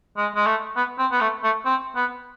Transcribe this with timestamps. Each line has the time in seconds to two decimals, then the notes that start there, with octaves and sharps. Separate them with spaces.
0.17 G#3
0.36 G#3
0.47 A3
0.77 B3
0.99 C4
1.12 B3
1.21 A3
1.44 A3
1.66 C4
1.96 B3